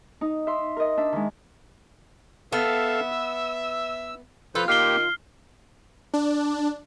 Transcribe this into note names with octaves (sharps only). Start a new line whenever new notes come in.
D#4
E5 C6
A#4 D#5
D4 E5
D#3 G#3
B3 A4 E5 F5 A5
E6
F3 F4 A4 B4 G6
D#3 A#3 G4 G5 F6 C7 G7
D4